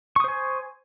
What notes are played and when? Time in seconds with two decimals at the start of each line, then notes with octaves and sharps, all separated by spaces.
0.16 C#6
0.20 D#6
0.24 C5
0.28 G#5